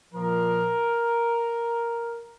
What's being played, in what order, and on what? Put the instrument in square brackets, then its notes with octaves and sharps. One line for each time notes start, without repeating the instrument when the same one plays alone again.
[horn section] A#2 F3 A#4